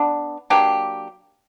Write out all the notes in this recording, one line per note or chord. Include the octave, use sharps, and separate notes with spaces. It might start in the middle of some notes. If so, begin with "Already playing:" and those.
Already playing: B3 D4
F#3 A#3 D4 G4